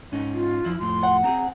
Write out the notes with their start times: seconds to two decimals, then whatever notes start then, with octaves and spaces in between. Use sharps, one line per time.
0.12 G#2 C#4 D#4
0.33 F4
0.65 F2 F3 E4
0.80 F2 A2 C6
1.03 F#5
1.24 C4 G4 G#4 A#5